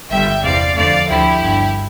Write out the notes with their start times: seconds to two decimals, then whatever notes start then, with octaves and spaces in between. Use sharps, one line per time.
0.10 G1 G2 D3 G3 E5 G5
0.43 E2 C3 G3 D5 F5
0.76 F2 D3 A3 D5 F5
1.09 D2 D3 F3 E4 G4
1.42 G1 G2 D3